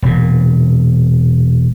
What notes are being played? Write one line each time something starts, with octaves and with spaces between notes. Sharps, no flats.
E1 A#2